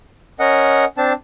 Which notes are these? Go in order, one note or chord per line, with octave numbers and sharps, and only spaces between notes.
C#4 A#4 D#5 F#5
C4 D4 A5